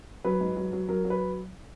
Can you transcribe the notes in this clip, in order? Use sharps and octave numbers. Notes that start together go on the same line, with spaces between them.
F#3 B4
G#2
F#3
F#3
F#3 A#4
F#3
B4